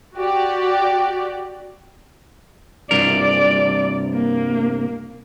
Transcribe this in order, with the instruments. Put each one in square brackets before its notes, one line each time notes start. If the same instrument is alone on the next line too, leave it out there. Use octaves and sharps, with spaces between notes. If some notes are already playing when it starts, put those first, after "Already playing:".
[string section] F#4 G4 D5
[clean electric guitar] C2 G2 A#4 [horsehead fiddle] D5
[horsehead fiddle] A#3